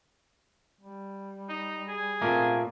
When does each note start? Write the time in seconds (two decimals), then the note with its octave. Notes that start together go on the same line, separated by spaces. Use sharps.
0.81 G3
1.49 D#4
1.88 G#4
2.22 A#2 A3 A#3 C4